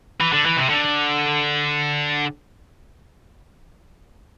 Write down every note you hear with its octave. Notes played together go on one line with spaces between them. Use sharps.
E3
D3
E3
C3
D3